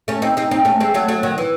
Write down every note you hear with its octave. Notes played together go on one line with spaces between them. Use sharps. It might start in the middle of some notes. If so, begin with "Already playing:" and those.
A3 C#4
C4 D#4
C4 D#4
C4 D#4
A3 C#4
G#3 C4
F#3 A3
F#3 A3
D#3 F#3
E3